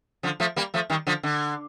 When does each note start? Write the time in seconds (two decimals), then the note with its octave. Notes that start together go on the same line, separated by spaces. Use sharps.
0.23 D3 F3
0.40 F3 A3
0.56 G3 A#3
0.74 F3 A3
0.90 D#3 G3
1.07 D3 F3
1.23 D3